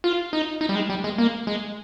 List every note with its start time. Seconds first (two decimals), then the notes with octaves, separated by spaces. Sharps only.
0.04 F4
0.33 D#4
0.61 D#4
0.69 G3
0.75 G#3
0.90 G3
1.04 G#3
1.18 A#3
1.47 G#3